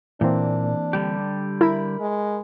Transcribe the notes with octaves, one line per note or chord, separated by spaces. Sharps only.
A#2 E3 A#3 C4 D4
D3 G3 G4
E4 A#4 B5
G#3